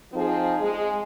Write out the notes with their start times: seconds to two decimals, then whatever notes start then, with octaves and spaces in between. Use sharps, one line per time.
0.14 F3 C4 D#4 G#4
0.61 G#3